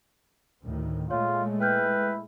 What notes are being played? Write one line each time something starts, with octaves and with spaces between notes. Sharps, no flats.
D2 A2 D#3
A#2 G#3 A3 F4 C#5
E4 B4 G5 F6 G6